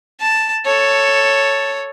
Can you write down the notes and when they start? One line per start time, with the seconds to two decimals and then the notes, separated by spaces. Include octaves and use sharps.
0.20 A5
0.66 A4 C#5